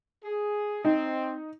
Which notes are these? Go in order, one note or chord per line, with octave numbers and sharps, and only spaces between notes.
G#4
C4 D#4